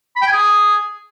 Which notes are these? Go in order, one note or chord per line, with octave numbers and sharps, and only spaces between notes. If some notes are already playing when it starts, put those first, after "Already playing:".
B5
G5
G#5
G#4